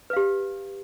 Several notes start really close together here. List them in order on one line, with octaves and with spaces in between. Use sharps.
B4 F5 G4